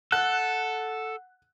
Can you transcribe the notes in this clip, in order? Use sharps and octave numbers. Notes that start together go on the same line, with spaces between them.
A4 F#5 F#6